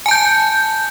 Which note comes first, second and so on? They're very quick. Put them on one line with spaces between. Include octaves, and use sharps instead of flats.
G#5 A5 G6